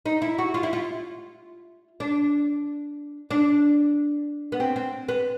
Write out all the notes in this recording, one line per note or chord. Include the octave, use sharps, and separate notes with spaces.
D#4
E4
F#4
F4
E4
F4
D4
D4
B3
C4
C4
B3